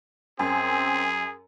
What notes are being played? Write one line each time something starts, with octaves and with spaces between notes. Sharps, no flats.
F#2 C4 G#4